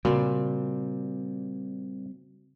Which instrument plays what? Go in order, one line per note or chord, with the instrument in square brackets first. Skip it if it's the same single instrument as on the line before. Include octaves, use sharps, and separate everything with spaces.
[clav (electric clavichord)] A#2 [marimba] C#3 [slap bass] G3 C4 [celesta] F#4